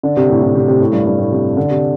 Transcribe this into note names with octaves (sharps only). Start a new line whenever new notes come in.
D3
C3
A2
A2
C3
C3
A2
G2
G2
A2
C3
D3
C3